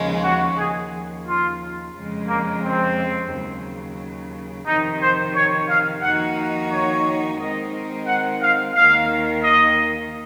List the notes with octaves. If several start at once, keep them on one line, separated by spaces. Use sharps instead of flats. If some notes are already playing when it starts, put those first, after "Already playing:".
Already playing: D#2 C#3 F3 G#3 C#4
F#4
D#2 C#3 F3 G#4
F4
F2 C#3 G#3
A#3
C4
D#2 C#3 F#3
F2 C3 D#3 D#4
C5
C#5
F5
F2 D#3 A#3 D#4 F#4 F#5
C#5
D#3 G#3 C4 D#4 A#4 D#5
F#5
F5
D#2 D#3 A#3 F5
D#5